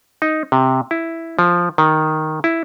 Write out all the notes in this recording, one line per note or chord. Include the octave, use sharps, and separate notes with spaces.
D#4
C3
E4
F3
D#3
E4